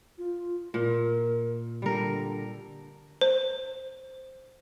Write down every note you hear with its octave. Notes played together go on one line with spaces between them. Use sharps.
F4
A#2 A#4
D3 G3 A#4
C5